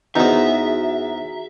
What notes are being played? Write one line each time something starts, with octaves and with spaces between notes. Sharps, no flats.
E2 B3 D#4 F#4 G#4 C5 E5 A#5